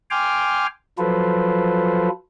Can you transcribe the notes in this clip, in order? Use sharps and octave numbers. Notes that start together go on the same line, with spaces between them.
G5 G#5 C6 D6 F6
F3 F#3 F4 A4 B4 C5